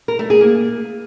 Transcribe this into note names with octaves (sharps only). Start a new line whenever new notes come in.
A#4
A3
G#4
A#3